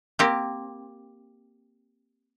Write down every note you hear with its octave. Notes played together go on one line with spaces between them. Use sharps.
A#3 C4 G4